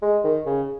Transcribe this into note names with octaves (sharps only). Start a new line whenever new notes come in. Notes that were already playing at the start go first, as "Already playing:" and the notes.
G#3
D#3
C#3